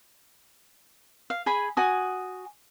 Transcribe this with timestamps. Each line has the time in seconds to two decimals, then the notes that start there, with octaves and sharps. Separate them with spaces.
1.30 F5
1.46 G#4 G#5 B5
1.77 F#4 G#5 D#6